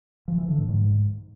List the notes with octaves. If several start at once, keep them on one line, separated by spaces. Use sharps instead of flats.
F3
E3
D3
A2
G#2